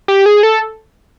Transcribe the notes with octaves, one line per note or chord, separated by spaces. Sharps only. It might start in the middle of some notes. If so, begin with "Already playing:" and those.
G4
G#4
A4